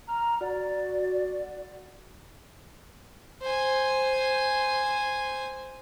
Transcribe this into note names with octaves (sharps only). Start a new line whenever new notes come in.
A#5 F6
F#4 D5
C5 G#5